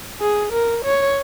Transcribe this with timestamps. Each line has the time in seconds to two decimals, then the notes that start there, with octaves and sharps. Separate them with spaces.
0.21 G#4
0.53 A#4
0.85 C#5